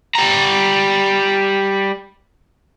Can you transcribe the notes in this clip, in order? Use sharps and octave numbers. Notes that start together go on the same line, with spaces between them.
G3 A#5